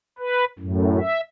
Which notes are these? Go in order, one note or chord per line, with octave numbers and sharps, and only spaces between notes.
B4
F#2 A2
E5